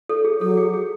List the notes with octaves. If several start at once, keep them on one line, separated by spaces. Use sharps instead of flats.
A4
G#4
F#3 A4
G#4
G#4